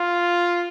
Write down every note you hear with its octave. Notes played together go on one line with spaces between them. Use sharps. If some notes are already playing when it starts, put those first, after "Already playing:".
Already playing: F4